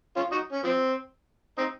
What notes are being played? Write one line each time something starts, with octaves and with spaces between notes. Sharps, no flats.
C#4 F4
D#4 F#4
C#4
F3 C4
C4 D#4